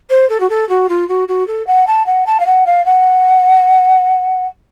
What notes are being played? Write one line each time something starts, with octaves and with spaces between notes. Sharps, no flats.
C5
A4
F#4
A4
F#4
F4
F#4
F#4
A4
F#5
A5
F#5
A5
F5
F#5
F5
F#5